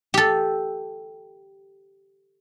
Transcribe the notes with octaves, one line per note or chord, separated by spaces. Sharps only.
G4 A4